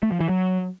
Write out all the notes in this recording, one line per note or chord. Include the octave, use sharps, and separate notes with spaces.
A3
F3
E3
F#3